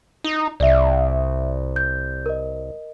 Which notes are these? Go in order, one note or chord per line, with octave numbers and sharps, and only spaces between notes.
D#4
C2 D5 E5
G6
A#4 D#5